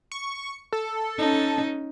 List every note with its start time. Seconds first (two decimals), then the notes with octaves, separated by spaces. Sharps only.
0.12 C#6
0.73 A4
1.18 C#4 D#4